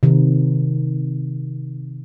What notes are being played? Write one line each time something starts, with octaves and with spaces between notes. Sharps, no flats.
C3 D#3